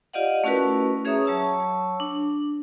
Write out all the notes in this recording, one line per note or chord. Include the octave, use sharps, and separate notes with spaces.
F4 G4 D5 D#5 F5 F#5
A3 C#4 E4 F#4 A#4 B4
C#4 G#4 C#5 E5 A#5 D#6
F#3 C#5 A5 C#6 E6
D4